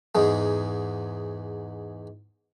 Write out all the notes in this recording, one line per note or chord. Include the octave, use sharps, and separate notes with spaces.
E2 G#2 G#3